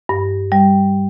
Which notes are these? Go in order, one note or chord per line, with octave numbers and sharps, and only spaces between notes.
G2
G3